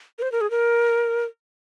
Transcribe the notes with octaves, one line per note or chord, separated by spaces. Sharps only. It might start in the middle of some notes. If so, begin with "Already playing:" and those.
A#4
C5
A#4
G#4
A#4